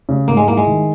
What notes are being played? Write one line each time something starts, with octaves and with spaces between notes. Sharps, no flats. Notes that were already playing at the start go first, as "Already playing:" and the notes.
C#3
G#2 A#3
G#3
A#3 E4
G#3
D#3